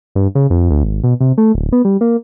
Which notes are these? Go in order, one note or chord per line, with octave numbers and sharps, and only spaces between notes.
G2
C#3
F2
D2
G#1
B2
C3
A3
D1
B3
G3
A#3